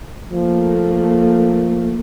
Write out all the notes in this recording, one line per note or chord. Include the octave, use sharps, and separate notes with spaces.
F3 A3 A#3